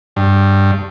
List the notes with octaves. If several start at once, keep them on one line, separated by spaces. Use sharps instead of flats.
G2